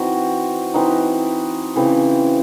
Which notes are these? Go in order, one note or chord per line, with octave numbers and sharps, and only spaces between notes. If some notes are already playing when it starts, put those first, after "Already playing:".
Already playing: E3 C4 D#4 F#4
E3 C4 D#4
C#3 E3 C4